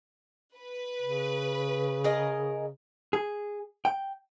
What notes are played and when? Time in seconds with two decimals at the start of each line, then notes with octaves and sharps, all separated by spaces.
0.57 B4
1.02 C#3
2.04 G#4 A#4 D#5
3.13 G#4
3.85 G5